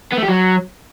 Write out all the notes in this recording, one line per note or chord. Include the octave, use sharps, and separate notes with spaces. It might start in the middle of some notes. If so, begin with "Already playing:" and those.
B3
A3
G4
F#3